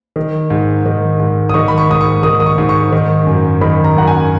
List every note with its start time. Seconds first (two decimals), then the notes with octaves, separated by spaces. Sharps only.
0.16 D#3
0.50 G#2
0.86 D#3
1.20 G#2
1.49 D#6
1.54 D#3 C#6
1.68 B5
1.78 C#6
1.89 G#2 D#6
2.01 C#6
2.23 D#3 D#6
2.40 D#6
2.46 C#6
2.58 G#2
2.69 C#6
2.92 D#3
3.27 F#2
3.61 D#3 B5
3.84 A#5
3.96 F#2 F#5
4.07 G#5